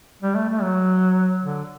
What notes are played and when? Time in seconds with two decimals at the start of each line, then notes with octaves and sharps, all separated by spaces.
0.22 G3
0.35 A3
0.49 A3
0.62 F#3
1.44 D3